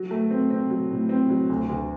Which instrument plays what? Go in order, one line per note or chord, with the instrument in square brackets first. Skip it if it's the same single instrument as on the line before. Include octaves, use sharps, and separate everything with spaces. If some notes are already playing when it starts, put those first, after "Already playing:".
Already playing: [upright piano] F#3
A3
C4
C4
F#3
A2
C4
F#3
D2
D2